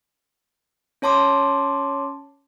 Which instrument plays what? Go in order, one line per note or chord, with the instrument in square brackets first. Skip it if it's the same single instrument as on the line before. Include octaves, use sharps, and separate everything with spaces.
[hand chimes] C#4 C#5 A5 C6 D6